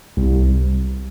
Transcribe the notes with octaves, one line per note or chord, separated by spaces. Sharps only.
C2